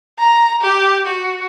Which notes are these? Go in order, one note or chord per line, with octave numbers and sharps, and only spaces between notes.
A#5
G4
F#4